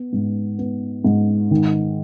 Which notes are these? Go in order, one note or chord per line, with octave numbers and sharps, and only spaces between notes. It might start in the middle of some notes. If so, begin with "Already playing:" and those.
Already playing: B3
G#2
B3
G#2
D#3